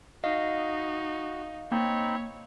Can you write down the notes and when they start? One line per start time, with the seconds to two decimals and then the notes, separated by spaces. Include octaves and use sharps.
0.24 D#4 F#4 D#5 F5
1.72 A#3 C4 D#4 C#5 G5 B5